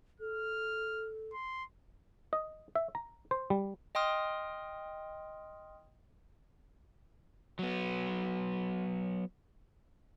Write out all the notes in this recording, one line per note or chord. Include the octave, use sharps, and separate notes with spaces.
A4 F6
C6
D#5
E5
A#5
C5
G3
D#5 G5 C6 D#6 F6
F#3 B3